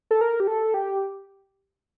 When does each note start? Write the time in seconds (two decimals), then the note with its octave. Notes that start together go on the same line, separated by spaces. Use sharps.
0.11 A4
0.21 A#4
0.40 G4
0.47 A4
0.74 G4